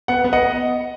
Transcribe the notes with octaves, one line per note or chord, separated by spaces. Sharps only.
B3 F#5
B3
D#5 F#5